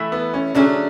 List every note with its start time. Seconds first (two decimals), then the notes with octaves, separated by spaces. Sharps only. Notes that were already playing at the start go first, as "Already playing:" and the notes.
Already playing: E3 A3 E4
0.12 B3
0.34 C#4
0.54 D3 F#3 A3 C#4 D4 G#4